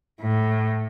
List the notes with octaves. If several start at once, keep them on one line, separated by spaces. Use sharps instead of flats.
A2